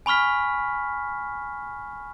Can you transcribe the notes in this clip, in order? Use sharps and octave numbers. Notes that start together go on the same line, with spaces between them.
G#5 B5 C#6 F6 B6